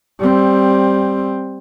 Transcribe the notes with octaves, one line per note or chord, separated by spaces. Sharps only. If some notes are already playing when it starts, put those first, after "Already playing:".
G3 C4